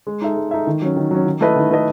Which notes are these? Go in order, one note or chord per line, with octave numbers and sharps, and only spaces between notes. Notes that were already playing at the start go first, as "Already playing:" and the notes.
G#3
D#4 A4 E5
G#3
D#4 A4 E5
D#3
F#3 C#4
D#3
F#3 C#4
D#3
A3 E4 B4 D#5
D#3
A3 E4 B4 D#5